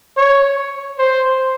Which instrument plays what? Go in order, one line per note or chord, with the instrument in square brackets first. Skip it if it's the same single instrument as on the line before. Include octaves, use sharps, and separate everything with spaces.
[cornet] C#5
C5